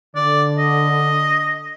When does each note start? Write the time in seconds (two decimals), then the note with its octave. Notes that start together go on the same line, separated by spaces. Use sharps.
0.16 D3 D5
0.58 D#5